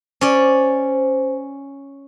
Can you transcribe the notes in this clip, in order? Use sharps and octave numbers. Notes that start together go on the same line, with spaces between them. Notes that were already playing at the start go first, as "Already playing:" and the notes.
C#4 C5 D5